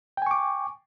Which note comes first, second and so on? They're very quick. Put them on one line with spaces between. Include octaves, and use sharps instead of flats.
G5 G#5 C#6 D6